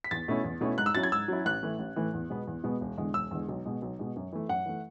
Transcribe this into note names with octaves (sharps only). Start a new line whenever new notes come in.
B6
E2 A6
B2 A3 C#4 E4
E2
B2 A3 C#4 E4
G#2 F#6
E6
F#3 C#4 E4 A6
G#6
G#2 E6
F#3 C#4 E4
A1 F#6
A2 E3 A3
A1
A2 E3 A3
E2
B2 G#3 B3
E2
B2 G#3 B3
E1
E2 D3 G#3
E1 E6
E2 D3 G#3
B1
B2 G#3
B1
B2 G#3
F#2
E3 A3
F#2 F#5
E3 A3